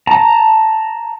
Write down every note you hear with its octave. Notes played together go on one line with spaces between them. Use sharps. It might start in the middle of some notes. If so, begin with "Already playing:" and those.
A5 A#5